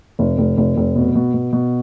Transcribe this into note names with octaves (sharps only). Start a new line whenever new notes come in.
F1
F1
F1
F1
B2
B2
B2
B2